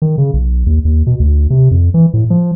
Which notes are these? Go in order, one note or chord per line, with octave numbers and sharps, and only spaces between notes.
D#3
C#3
B1
D#2
D#2
B2
D2
C3
F2
E3
A2
F3